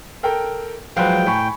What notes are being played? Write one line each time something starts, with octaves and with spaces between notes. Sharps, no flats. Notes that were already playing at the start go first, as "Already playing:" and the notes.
A4 A#4 G5
F3 F#3 G#3 B4 C5 F5 G5
A2 G#5 B5 C#6